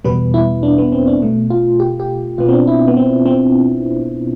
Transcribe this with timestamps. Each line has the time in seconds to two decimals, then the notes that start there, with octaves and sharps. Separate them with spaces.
0.05 E2 B2 G3 B3 B4
0.34 E4
0.63 D4
0.78 B3
0.92 C4
1.07 D4
1.22 B2 A3
1.50 F4
1.80 G4
2.00 G4
2.38 B2 B3 F4
2.49 C4
2.53 D4
2.67 E4
2.88 B3
2.97 C4
3.26 C4